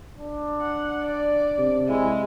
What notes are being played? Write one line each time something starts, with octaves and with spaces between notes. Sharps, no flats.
D4
F#5
D5
C3
G#3 E4